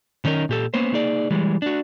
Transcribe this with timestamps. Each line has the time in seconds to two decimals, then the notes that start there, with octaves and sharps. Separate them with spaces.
0.25 D#3 C#4 D#4 A#4
0.49 A#2 G4 A4
0.74 A#3 B3 C#4 C5
0.93 A#3 D#4 G#4 D5
1.31 E3 G3 G#3
1.62 D4 F#4